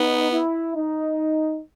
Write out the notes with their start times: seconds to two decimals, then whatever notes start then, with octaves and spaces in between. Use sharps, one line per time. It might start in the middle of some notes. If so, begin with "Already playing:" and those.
Already playing: B3 D#4
0.30 E4
0.75 D#4